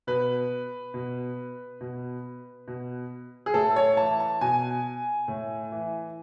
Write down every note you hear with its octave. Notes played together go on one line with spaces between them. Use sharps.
B2 B4
B2
B2
B2
G#4
A2 A4
C#5
E3 A5
A5
B2 G#5
A2
E3